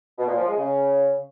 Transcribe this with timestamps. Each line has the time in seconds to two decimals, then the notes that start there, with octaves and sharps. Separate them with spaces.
0.18 B2
0.28 A#2
0.37 F3
0.47 G#3
0.57 C#3